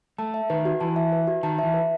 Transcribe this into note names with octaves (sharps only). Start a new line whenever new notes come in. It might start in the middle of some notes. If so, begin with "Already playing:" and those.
A3 A5
E5
D#3 B4
F#4
E3 A5
E5
B4
F#4
D#3 A5
E3 E5
B4